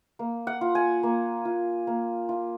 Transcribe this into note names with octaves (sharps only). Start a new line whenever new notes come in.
A#3
F#5
F4
G#5
A#3
F4
A#3
F4